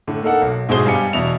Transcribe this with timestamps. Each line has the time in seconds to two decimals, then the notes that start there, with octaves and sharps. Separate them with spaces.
0.08 A2 D3
0.22 A#3 D#4 A4 F#5
0.42 B1
0.69 G#2 B2 E4 G#4 C5 G7
0.86 G2 G3 F5 G#5 C#7
1.13 E2 B2 E4 F7